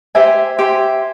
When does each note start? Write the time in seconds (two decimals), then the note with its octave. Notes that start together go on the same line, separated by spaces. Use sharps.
0.15 G4 C5 E5 G#5
0.59 G4 C5 E5 G#5